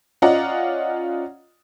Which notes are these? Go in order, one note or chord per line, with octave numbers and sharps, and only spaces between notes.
C#4 F4 D5 D#5 F#5 A#5